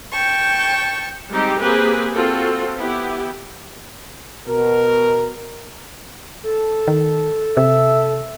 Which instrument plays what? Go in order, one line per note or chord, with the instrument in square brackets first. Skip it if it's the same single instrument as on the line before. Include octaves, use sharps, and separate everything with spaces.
[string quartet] G5 A5 C#6
[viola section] G3 G#3 C4 D#4 G4
A#3 C4 G4 G#4 B4
C4 F4 F#4 A4
B3 E4 G4
[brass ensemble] B2 A#4
[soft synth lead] A4
[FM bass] D#3
[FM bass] C3 [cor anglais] E5